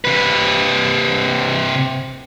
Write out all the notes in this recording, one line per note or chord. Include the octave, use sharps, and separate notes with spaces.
C3 B4